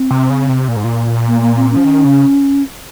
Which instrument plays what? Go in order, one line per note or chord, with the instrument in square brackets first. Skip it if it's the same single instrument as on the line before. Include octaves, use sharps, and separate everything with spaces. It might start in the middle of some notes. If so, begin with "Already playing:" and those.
Already playing: [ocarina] C4
[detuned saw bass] C3
C#3
C3
A#2
G#2
A#2
[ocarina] A#3
A#3
C4
C#4
[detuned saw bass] F3
D#3
C#3